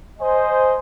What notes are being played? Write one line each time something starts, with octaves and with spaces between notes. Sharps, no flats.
C5 D#5 G#5